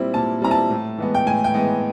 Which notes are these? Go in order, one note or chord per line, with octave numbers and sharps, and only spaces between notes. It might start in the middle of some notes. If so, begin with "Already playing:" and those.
Already playing: A#2 G3 C4 E4
A#2 A5
G3 C4 E4 A#5
A5
A2
E3 G#3 B3
G5
A2 G#5
G5
E3 G#3 B3